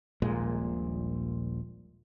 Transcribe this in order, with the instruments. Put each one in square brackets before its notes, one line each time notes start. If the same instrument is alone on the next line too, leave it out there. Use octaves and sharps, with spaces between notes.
[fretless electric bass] D#1 A#1 A#2 G#3